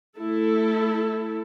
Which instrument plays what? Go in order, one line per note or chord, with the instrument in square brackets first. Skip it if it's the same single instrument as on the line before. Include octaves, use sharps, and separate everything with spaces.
[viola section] A3 E4 A4